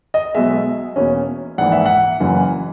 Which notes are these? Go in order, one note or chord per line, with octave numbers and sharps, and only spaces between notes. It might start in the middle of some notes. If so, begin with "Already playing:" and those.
D#5
B1 B2 G#3 E5
E2 B2 A#3 C#4
A#1 G#2 E3 A#3 F#5
E5
F#5
F#1 F#2 E3 A#3